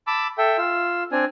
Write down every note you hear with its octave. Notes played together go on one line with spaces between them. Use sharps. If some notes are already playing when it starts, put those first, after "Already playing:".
A5 B5 D6 E6
A4 E5 G5
F4 E6
C4 D4 G#5